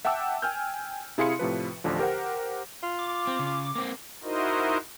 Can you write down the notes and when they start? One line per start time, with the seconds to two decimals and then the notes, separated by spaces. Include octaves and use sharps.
0.05 E5 F#5 G5 A5 D6 E6
0.42 G5 G#5 F6 G6
1.18 C3 E4 G#4 F5 C6 C#7
1.39 A2 C3 F3 B4
1.84 A1 D2 D3 F3
1.99 G4 A#4 C5 F#5
2.83 F4
2.99 D6
3.27 C4
3.39 C#3
3.75 A#3 C4
4.23 D#4 E4 F#4 A#4 C5 D#5